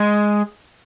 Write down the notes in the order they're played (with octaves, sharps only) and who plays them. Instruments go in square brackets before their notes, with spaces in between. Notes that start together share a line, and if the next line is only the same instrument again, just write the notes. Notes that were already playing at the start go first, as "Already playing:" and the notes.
Already playing: [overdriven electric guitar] G#3